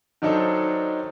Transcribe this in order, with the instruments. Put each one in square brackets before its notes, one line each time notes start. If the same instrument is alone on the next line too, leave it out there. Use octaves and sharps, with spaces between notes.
[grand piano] D#3 F#3 D4 D#4 A4 C5